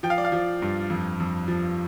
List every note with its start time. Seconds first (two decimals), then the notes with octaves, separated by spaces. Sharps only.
0.03 F3 G5
0.10 F5
0.18 D5
0.25 F5
0.32 F3
0.62 G2
0.90 F2
1.20 F2
1.48 F3